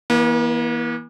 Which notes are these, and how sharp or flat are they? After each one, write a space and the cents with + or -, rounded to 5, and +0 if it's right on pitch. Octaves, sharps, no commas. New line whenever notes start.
E3 -10 A#3 +45